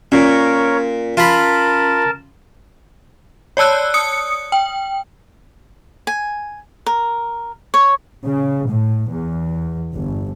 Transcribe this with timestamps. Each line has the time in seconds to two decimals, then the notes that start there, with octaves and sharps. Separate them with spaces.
0.12 A#2 C#4 A#4 C#5
1.17 F4 A#4 A5 B5
3.57 C#5 D5 A5 E6 F#6
3.94 D#6 C#7
4.52 G5
6.07 G#5
6.86 A#4
7.74 C#5
8.26 C#3
8.69 A2
9.12 E2
9.94 G1